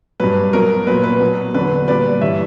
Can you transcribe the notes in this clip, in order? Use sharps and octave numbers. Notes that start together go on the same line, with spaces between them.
G2 F#3 B4
B2 F#3 A#4
A#2 F#3 B4
B4
B2 F#3
E2 D3 F#3 B4
A#2 G3 B4 D5
G2 E3 G3 C#5 E5